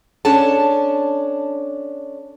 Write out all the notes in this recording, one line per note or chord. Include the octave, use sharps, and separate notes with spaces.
C#4 D4 A4 A5